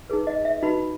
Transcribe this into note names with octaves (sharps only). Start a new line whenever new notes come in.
D#4 G#4 B4
D#5
E5
D#4 F#4 B4 B5